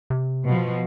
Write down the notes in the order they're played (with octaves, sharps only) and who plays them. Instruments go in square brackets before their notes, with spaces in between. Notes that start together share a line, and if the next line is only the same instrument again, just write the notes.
[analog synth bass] C3
[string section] B2 F3